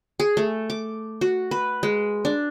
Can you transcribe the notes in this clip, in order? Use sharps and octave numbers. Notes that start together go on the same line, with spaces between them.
G#4
A3
D6
F#4
B4
G#3
D4